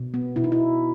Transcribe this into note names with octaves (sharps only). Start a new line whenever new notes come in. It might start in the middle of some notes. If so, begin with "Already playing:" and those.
Already playing: B2
B3
B2 E4
D#4
E4